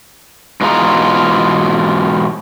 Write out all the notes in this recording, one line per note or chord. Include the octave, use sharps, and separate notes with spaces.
G#2 B2 E3 F4 G#4 A#5